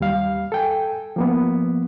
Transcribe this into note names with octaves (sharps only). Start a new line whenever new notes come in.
D#2 G3 F5
A4 G5 G#5
F3 A#3 B3